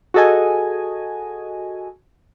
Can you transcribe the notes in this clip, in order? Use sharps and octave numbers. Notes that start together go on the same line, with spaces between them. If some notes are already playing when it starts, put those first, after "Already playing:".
F#4 G#4 A4 D#5 G#5